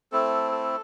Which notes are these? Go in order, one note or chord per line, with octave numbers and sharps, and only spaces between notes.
A3 C4 E4 A4
A4